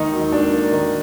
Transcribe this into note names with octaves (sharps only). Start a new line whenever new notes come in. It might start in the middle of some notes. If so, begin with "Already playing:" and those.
Already playing: D#2 D#3 D#4
F#3
A#3 D4
A#3
D#3